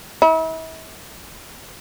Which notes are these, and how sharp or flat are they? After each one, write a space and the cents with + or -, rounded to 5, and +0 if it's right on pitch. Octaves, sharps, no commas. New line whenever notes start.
E4 -40